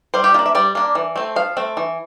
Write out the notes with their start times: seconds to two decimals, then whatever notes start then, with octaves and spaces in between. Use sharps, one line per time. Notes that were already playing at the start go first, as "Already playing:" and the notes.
0.14 G3 C5
0.24 G4
0.34 A#3 D4 F4
0.46 E5
0.55 G3 D5
0.75 A#3 D4
0.95 E3
1.16 A3 C4
1.36 F3 F5
1.57 A3 C4
1.77 E3